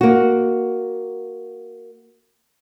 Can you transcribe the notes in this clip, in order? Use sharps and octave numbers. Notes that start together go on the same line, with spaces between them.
A#3 F#4